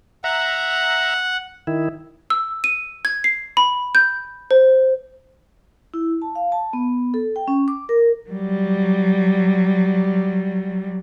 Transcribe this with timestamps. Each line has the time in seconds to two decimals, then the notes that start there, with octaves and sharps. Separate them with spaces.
0.24 E5 F#5 A#5
1.67 D#3 E4
2.30 E6
2.64 D#7
3.05 G#6
3.24 C7
3.57 B5
3.95 G6
4.51 C5
5.94 E4
6.22 A5
6.35 F5
6.52 A5
6.73 B3
7.14 A4
7.36 G5
7.48 C#4
7.68 D6
7.89 A#4
8.30 F#3 G3